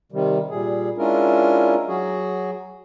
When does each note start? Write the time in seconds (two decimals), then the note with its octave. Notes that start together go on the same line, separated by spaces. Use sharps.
0.12 C3 D#3 G3
0.50 A#2 G3 G#4
0.98 G#3 C#4 D4 E4 F4 A#4
1.88 F#3 F#4 G#4